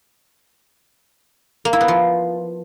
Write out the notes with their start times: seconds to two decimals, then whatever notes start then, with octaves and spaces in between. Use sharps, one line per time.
1.65 A#3
1.73 E4
1.81 B3
1.88 F3